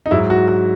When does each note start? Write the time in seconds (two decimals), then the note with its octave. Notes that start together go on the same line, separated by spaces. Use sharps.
0.06 D#4
0.11 G#2 F#3 E4
0.30 F#4
0.48 F#4